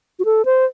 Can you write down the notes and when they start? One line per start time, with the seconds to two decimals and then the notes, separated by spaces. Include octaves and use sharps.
0.19 F#4
0.25 A4
0.45 C5